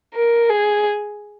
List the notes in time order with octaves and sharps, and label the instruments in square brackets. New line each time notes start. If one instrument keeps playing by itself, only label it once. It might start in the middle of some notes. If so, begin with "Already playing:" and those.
[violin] A#4
G#4